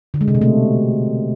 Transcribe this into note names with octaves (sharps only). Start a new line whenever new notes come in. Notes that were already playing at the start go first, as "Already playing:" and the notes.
D3
G#3
C3
B2
A3